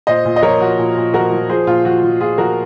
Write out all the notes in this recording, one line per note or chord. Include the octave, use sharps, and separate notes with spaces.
A#2 C5 D#5
A#2
D#5
F3 A#4 C#5
F3 F#4
A#2
A#2
F3 F#4 A#4
F3
F3 G#4 C5
A#2 F4
F3 F#4
F3
A#2 F4 G#4
F3 F#4 A#4